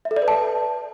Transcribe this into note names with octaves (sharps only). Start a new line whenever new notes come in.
E5
A4
D5
B4
A5